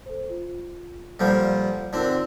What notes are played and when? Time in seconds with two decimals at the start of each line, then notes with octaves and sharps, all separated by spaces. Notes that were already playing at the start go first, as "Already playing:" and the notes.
0.06 A4 C5
0.30 F4
1.19 A#2 F3 G3 A4 F#5 G6
1.93 D3 C4 D#4 F4 A#4